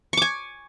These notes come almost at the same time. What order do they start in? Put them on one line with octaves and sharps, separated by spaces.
C#6 D6 G#5